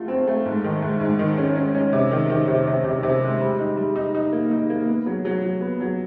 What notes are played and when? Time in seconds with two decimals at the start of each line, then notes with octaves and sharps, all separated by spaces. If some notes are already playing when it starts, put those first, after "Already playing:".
Already playing: F#3 A3 F4
0.08 C4
0.27 A3
0.46 G#2
0.64 D#3
0.82 G#2
1.00 G#2
1.19 D#3
1.38 C#4
1.56 C#4
1.75 C#4
1.93 C3
2.11 D#3
2.30 D#3
2.48 C3
2.67 C3
2.84 C3
3.03 C3
3.22 G#3
3.40 G3
3.58 D#4
3.77 G3
3.96 D#4
4.15 D#4
4.32 A#3
4.51 D#4
4.70 A#3
4.87 B3
5.06 F#3
5.25 F#3
5.43 F#3
5.61 B3
5.80 F#3